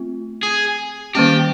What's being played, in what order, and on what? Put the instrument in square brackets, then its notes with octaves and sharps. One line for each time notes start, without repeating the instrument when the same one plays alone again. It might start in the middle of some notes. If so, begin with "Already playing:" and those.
Already playing: [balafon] A3 C4 F4
[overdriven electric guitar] G#4
[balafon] D#3 G3 A#3 C#4 [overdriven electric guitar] G4